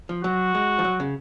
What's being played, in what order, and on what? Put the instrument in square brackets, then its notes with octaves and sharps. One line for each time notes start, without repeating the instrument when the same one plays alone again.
[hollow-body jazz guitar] F3
[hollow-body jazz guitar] F#3 [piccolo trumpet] F#4
[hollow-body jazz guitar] G#3
F3
F#3
C#3